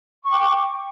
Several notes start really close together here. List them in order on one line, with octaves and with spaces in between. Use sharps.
C#6 D6 G5